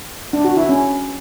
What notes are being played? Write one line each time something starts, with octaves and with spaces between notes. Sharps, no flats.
D4
F#4
E4
C#4